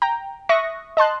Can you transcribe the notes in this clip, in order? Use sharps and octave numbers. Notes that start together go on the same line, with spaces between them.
G5 A#5
E5 C#6 D#6 F#6 A#6
D#5 A5 C6 F#6